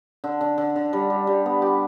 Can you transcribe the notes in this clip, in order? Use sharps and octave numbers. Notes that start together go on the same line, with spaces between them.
D3
D3
D3
D3
G3
G3
G3
B3
G4